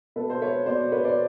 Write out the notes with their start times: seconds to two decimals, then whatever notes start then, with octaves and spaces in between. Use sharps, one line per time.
0.16 B2 A4 B4
0.30 C5
0.42 B4 C#5
0.66 B2 C5 D5
0.92 B4 C#5
1.04 C5 D5